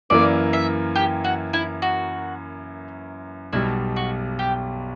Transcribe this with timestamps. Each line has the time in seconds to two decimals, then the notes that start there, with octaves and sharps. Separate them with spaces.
0.10 F#2 E3 A#3 D5
0.53 E5
0.95 G4
1.24 F#4
1.53 E4
1.82 F#4
3.53 B1 B2 G3 E4
3.96 F#4
4.39 G4